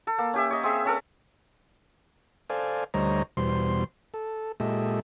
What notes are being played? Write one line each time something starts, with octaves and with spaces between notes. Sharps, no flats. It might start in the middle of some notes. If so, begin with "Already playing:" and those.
A4
A#3
C#4 G4 E5
C#5 D#5
C4 G#4 E5
C#4 A4 A#4
A4 C5 D5 F5 G#5
D2 G3 C5 C#5 D#5 A#5
E2 B2 G3 C5 C6
A4
A#2 G#3 G4 A4 D#5 E5